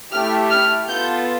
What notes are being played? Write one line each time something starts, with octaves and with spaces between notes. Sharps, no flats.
A3 E4 G4 F6
F6
B3 F4 A4 G6